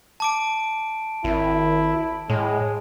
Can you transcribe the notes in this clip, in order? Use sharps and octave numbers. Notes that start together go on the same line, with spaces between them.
A5 D6 D7
G#1 E4
A2 G#3